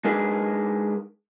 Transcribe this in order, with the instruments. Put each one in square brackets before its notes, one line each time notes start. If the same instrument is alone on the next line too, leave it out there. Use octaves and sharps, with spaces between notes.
[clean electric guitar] G#3 D4 D#4 G#4 A#4 B4